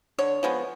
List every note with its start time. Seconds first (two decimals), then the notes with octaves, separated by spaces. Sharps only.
0.19 D3 C#5
0.43 F3 G#3 B3